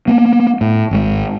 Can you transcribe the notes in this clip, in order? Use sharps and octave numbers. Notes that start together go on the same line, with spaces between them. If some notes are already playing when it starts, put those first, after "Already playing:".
A#3 B3
A2
G#1 G#3